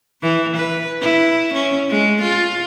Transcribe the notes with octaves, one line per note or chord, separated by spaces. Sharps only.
E3
B4
E4
C#4
G#3
F4